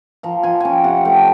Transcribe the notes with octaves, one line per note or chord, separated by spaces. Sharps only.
F3 A#5
F3 G#5
C#4 G5 G#5
C3 F#5
A3 G5